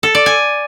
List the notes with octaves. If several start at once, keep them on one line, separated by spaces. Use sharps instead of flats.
A4
D5
G#5